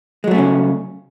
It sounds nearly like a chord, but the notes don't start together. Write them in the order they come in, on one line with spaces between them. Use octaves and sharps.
G#3 F#3 A3 C#4 C#3